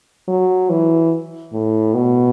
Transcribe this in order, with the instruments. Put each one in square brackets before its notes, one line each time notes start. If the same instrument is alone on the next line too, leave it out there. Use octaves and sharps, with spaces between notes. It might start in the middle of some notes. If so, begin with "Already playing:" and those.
[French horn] F#3
E3
A2
B2